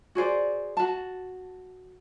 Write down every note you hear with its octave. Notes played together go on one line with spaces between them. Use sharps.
F#4 G#4 C5 D5
F#4 A5